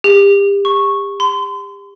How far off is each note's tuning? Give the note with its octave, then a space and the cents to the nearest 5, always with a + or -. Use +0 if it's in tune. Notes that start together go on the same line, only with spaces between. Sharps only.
G4 +35
C#6 -10
C6 -40